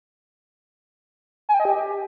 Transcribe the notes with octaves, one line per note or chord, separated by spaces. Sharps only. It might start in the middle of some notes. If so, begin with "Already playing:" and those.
G#5
G5
D#5
G4